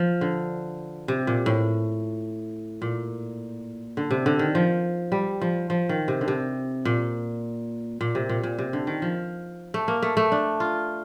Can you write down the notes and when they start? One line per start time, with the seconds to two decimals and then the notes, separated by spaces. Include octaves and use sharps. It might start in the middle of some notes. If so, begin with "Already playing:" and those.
Already playing: F3
0.21 D3
1.08 C3
1.27 A#2
1.46 A2
2.82 A#2
3.97 D3
4.11 C3
4.26 D3
4.39 D#3
4.55 F3
5.12 G3
5.41 F3
5.70 F3
5.89 D#3
6.08 C3
6.21 D3
6.28 C3
6.85 A#2
8.01 A#2
8.15 C3
8.29 A#2
8.43 A#2
8.59 C3
8.73 D3
8.87 D#3
9.02 F3
9.74 A3
9.88 A#3
10.02 A3
10.17 A3
10.32 D4
10.60 F4